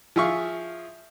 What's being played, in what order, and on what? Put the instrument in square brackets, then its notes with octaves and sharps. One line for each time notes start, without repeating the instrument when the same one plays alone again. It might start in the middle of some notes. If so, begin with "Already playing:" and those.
[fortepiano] F3 G#4 E5 F5 C#6